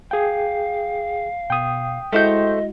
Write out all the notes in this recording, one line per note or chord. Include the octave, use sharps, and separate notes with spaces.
G#4 F5 G5
B2 G5 D#6
G#3 A3 E4 F#4 C5 D#5 G6